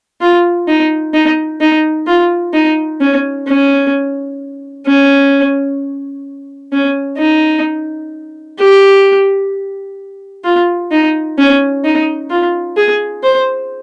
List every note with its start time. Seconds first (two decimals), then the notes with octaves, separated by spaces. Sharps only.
0.21 F4
0.68 D#4
1.14 D#4
1.61 D#4
2.07 F4
2.53 D#4
3.01 C#4
3.47 C#4
4.87 C#4
6.73 C#4
7.18 D#4
8.59 G4
10.44 F4
10.91 D#4
11.38 C#4
11.85 D#4
12.30 F4
12.77 G#4
13.23 C5